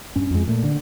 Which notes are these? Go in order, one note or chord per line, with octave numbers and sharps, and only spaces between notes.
G2 C#4
F2 G#3
A#2 A3
D3